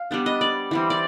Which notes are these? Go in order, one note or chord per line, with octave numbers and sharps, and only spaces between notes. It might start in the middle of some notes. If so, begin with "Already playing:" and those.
Already playing: F5
G3 B3 D4
D#5
D5
E3 G3 C4
D5